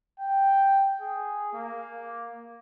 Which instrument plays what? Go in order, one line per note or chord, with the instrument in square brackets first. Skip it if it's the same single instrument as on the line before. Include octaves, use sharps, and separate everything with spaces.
[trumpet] G5
G#4
A#3